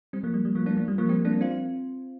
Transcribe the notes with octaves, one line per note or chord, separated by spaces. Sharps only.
G3 C4
F3 A#3
G3
G3
F3 A#3
A#3 D4
F3 A#3
G3
F3 A#3
G3 C4
A#3 D4
C4 F4